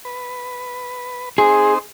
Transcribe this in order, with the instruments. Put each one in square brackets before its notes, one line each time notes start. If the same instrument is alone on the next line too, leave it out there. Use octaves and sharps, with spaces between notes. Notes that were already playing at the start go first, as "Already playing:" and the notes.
[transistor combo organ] B4
[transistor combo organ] C4 D#4 C5 [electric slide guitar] G#4